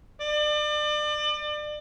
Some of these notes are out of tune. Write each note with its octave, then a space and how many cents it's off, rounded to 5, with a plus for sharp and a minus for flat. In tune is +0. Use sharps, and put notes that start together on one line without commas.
D5 +35